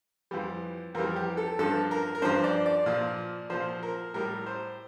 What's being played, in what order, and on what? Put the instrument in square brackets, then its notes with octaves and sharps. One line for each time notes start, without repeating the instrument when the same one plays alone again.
[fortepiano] F2 E3 G3
F2 E3 G3 A#4
G4
A4
G2 F3 A4
A#4
A#4
G2 F3 C5
D5
D5
A#2 F3
A#2 F3 C5
A#4
A2 G3 A#4
C5